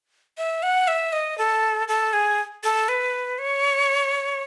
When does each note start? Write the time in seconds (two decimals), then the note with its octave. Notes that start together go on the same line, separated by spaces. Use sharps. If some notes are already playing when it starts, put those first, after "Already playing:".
0.38 E5
0.63 F#5
0.88 E5
1.13 D#5
1.38 A4
1.88 A4
2.13 G#4
2.64 A4
2.89 B4
3.38 C#5